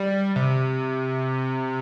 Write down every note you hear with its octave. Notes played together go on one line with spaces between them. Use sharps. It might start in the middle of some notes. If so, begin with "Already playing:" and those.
Already playing: G3
C3